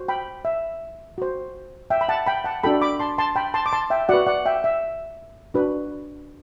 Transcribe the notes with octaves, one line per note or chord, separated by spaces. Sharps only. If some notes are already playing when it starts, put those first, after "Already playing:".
Already playing: F#4 C5
G5 B5
E5
F#4 C5
E5 G5
B5
F#5 A5
G5 B5
F#5 A5
D4 F#4 A4 G5 B5
B5 D6
A5 C6
A5 C6
G5 B5
A5 C6
D6
A5 C6
E5 G5
F#4 B4 D5 F#5
D5 F#5
E5 G5
E5
D4 F#4 B4